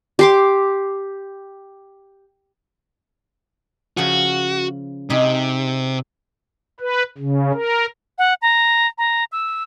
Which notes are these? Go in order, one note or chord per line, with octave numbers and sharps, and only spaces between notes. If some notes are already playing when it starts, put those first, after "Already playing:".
G4 C6 D6
C#3 F3 C#4 F#4
C3 D#4 G4 G#4
B4
C#3
A#4
F#5
A#5
A#5
E6